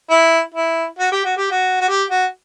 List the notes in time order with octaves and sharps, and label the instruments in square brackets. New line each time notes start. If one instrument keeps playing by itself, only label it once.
[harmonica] E4
E4
F#4
G4
F#4
G4
F#4
F#4
G4
F#4